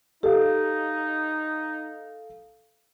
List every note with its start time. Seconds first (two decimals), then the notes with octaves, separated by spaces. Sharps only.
0.23 D#4 G4 A4 F5